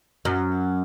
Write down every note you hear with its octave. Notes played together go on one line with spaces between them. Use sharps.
F#2